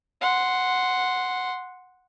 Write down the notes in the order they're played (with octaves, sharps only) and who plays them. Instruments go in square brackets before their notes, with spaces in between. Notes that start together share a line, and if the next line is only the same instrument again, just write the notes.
[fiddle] F#5 C6